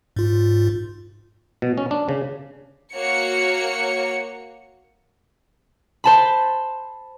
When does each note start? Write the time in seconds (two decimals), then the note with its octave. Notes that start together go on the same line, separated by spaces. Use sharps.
0.16 G#2 F4
1.62 B2
1.77 C#4
1.91 D4
2.09 C#3
2.93 A#3 F#4 C#5 C#7
6.04 C5 A5 B5